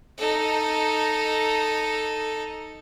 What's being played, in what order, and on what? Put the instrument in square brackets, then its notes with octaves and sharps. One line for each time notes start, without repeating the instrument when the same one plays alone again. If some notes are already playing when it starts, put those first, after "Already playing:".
[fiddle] D#4 A4